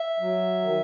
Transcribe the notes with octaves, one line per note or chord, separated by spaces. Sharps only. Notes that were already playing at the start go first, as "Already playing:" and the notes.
Already playing: E5
F#3
D#3